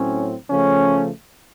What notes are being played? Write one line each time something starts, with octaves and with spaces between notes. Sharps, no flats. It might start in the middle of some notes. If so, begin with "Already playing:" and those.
Already playing: A2 F#3 C4 C#4
C#3 F3 A3 C#4